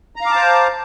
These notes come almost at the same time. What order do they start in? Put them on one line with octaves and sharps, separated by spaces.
A#5 F5 D6 A5 C5